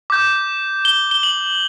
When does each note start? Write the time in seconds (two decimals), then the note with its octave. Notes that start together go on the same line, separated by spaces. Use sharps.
0.10 D6 G6
0.85 G7
1.11 G7
1.23 F#7